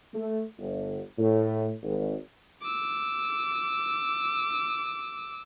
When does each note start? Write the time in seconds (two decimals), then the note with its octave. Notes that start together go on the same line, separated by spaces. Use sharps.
0.14 A3
0.59 G1
1.18 A2
1.82 G#1
2.62 D6 E6